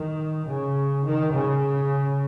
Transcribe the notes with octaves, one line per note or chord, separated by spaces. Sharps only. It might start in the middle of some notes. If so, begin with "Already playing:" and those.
Already playing: D#3
C#3
D#3
C#3